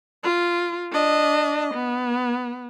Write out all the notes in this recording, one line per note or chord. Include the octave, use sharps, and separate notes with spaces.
F4
D4 D#5
B3